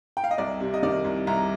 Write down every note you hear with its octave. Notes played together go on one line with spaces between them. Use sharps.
G5
F5
D#5
C2 D5
C3
D#5
D#3 D5
C2
C2 A#5